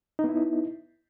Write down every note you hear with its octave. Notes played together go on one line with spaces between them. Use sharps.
B3 D#4 E4